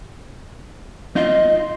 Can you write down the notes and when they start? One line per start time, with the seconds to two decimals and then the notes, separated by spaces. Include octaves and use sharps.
1.16 D#4 F4 D#5